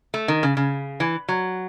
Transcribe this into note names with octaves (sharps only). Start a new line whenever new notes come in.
A3
D#3
C#3
C#3
E3
F#3